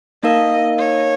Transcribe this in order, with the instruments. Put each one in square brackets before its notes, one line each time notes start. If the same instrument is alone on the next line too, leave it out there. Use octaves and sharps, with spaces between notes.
[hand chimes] A#3 D#4 A#4 F5 [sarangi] D#5
[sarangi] C#5